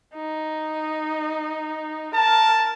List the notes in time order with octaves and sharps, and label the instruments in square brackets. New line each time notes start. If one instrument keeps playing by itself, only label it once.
[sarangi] D#4
[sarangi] A#4 [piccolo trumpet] A5